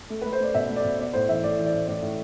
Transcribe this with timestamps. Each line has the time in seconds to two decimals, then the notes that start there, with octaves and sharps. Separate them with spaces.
0.10 A3
0.22 B4
0.25 A3
0.33 C5
0.40 A3 D5
0.54 B2 E5
0.70 A3
0.76 D5
0.84 B2
0.99 B3 D5
1.13 A2 C5
1.29 E3 E5
1.43 A2 D5
1.59 E3
1.66 D5
1.73 A2
1.88 A2 D5
2.02 A2